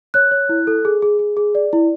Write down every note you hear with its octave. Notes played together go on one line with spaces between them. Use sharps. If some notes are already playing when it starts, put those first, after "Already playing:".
C#5 F#6
C#5
E4
A4
G#4
G#4
G#4
G#4
D5
E4